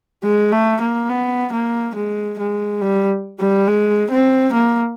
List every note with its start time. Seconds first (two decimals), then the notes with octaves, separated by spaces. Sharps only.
0.23 G#3
0.52 A3
0.81 A#3
1.09 B3
1.53 A#3
1.95 G#3
2.39 G#3
2.81 G3
3.39 G3
3.67 G#3
4.11 C4
4.53 A#3